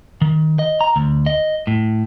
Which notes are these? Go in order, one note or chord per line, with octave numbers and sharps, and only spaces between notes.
D#3
D#5
A#5
D2
D#5
A2